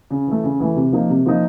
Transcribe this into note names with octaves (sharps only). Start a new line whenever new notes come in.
C#3
E3 A3
C#3
E3 A3
C3
F3 A#3 D#4
C3
F3 A#3 D#4